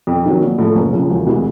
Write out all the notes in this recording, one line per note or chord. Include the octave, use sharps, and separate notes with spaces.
F2
C3 D#3 F#3
A#1
A2 F3 A3
F#1
F2 C#3 F3
E1
D2 C3 E3 G#3